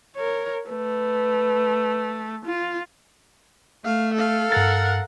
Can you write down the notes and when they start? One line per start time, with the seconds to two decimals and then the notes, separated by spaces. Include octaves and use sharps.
0.15 A#4 C#5
0.69 A3 B4
2.46 F4
3.84 A3 F5
4.14 A4 F5
4.52 G2 A#4 F#5 A6